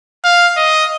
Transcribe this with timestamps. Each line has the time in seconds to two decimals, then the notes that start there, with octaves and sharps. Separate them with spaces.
0.24 F5
0.57 D#5